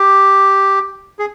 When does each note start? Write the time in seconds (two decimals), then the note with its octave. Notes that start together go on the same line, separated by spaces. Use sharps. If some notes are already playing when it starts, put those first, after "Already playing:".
Already playing: G4
1.19 G#4